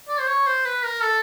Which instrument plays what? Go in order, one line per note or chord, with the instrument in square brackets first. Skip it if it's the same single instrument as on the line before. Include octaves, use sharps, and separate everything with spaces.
[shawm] D5
C5
C#5
C5
B4
A#4
A4